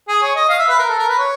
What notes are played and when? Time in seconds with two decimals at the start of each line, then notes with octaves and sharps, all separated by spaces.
0.08 G#4
0.22 C#5
0.35 D#5
0.49 F5
0.58 E5
0.68 B4
0.78 A#4
0.89 A4
0.98 A#4
1.08 B4
1.18 C#5